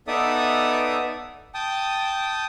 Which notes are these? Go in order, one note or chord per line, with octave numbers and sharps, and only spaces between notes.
B3 D#4 A4 D5 E5 D#6
G5 A5 D#6